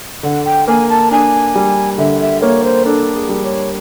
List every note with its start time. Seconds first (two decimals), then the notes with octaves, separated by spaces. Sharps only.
0.23 D3 F#5
0.45 G5
0.68 A#3 G#5
0.89 A5
1.11 D4 G#5
1.55 G3
1.98 D3 E5
2.21 E5
2.42 A#3 C#5
2.64 C5
2.85 D4 A4
3.15 G#4
3.29 G3
3.44 C#5